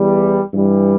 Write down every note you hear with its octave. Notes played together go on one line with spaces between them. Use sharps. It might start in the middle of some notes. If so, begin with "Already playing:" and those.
Already playing: E2 E3 G3
G2 E3 G3